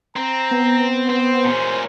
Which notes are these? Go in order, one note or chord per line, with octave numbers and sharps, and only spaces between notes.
C4 A#5
B3
C4 C5
A#2 C#4